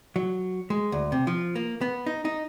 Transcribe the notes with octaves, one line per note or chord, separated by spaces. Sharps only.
F#3
G#3
D2
C3
F3
A#3
B3
D#4
D#4